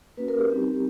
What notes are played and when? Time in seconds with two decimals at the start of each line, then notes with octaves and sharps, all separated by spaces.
0.17 A#3 C#4 F#4 B4
0.28 A#4
0.39 G4
0.49 G3 C4 D#4 G4